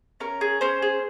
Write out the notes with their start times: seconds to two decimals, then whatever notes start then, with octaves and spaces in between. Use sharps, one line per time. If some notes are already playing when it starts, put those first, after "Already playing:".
0.20 C#4 A#4
0.41 G#4
0.61 C#4 C5
0.82 G#4